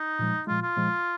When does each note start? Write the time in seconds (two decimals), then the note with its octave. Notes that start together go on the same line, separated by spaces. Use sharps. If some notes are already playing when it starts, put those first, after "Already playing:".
Already playing: D#4
0.19 A#2 F3 G#3
0.47 A#2 F3 G#3 F4
0.62 F4
0.76 A#2 F3 G#3